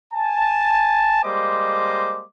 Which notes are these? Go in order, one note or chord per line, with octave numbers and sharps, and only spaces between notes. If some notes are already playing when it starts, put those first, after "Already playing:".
G#5 A5
G3 G#3 A#3 C5 D#5 D6